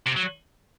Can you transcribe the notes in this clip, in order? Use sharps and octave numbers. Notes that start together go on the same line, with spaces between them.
C3
F#3